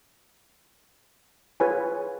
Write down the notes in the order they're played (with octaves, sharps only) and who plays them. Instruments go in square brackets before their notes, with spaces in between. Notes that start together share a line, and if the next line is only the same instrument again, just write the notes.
[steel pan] F4 G#4 B4 C#5 G#5